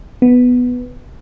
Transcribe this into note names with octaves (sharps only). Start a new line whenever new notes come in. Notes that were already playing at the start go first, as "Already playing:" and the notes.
B3